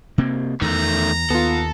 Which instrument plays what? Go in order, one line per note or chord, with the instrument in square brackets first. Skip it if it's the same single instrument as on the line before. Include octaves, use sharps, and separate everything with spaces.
[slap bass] C3 A#3 C4
[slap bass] E2 [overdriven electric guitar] D#3 A3 [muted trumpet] A#5
[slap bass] D#2 [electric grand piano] B3 F4 [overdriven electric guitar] A4